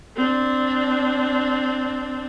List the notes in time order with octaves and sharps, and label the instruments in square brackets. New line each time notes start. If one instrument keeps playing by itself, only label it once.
[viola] C4 D4